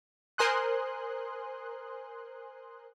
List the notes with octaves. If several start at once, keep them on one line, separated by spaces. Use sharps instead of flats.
A#4 C5 G#5 C6 D#6 F#6